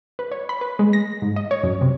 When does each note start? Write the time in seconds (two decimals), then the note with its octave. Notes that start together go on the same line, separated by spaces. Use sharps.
0.19 B4
0.31 C#5
0.49 B5
0.61 B4
0.79 G#3
0.93 A#6
1.22 G#2
1.36 D#5
1.51 C#5
1.63 F#2
1.81 C3